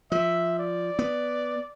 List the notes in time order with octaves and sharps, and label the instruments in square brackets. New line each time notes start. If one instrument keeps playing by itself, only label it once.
[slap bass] F3 [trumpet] E5
[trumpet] D5
[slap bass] B3